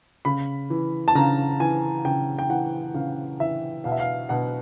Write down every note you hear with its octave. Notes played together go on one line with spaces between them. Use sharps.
C#3 B5
E3
A5
C#3 A#5
E3 G#5
C#3 G5
G5
E3 F#5
C#3 F5
E3 E5
B2 F5
E5
F5
B2 F#5